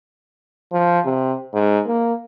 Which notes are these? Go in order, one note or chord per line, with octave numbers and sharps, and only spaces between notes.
F3
C3
G#2
A#3